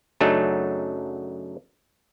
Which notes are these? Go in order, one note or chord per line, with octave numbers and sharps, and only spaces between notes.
F#2 C#3 F#3 A3 D4 D#4